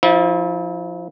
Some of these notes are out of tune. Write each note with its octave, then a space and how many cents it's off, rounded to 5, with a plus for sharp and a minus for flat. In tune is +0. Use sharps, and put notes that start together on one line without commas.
F3 +5 E4 -35